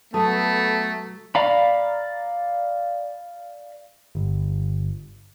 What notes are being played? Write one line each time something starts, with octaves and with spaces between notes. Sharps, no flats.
F#3 A3 B3 A4 A5 D#6
D5 F5 A#5 B5
G1